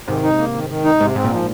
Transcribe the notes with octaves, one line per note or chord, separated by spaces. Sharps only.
G#2 C3 D#3
D#4
A#3
D#3
D#3
D#4
G#2 C3
G#2 C4
A#2
F3